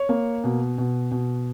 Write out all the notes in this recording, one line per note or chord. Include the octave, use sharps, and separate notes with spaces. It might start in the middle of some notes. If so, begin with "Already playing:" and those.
Already playing: C#5
A#3
B2
B2
B2